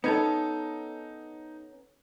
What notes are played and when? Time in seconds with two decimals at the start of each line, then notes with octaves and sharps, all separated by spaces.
0.04 B3 C#4 D#4 A4 G#6